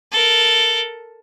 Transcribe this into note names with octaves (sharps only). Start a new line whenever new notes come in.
A4 A#4